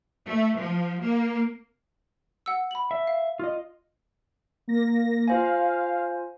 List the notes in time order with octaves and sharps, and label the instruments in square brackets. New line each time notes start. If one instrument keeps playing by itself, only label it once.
[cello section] A3
F3
A#3
[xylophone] F#5 E6
B5 F#7
[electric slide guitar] E5
[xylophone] F5
[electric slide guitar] F4 D#5
[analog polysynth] A#3 A#6
[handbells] F4 C5 G#5 [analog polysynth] F5